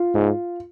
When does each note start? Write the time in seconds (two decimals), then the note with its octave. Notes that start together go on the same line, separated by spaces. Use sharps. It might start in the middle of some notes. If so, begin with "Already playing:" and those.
Already playing: F4
0.14 G#2